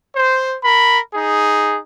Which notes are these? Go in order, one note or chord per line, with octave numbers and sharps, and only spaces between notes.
C5
A#4 B5
D#4 G#4